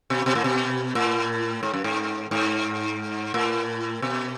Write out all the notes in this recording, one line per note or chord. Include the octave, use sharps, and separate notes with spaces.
B2
B2
A2
B2
A2
G#2
F#2
G#2
G#2
A2
B2